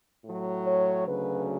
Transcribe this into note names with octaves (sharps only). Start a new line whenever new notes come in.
A2 F#3
C#5
D2 C#3 F#3 B4